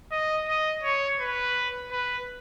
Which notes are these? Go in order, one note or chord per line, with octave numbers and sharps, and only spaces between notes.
D#5
D#5
C#5
B4
B4